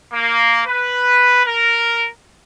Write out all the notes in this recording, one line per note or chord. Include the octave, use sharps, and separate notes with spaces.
A#3
B4
A#4